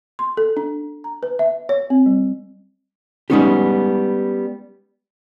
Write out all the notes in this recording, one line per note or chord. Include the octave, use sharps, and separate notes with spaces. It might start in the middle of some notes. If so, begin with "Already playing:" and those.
C6
A4
D4
A#5
B4
E5
C#5
C4
G3
G3 G#3 B3 C#4 D#4 G4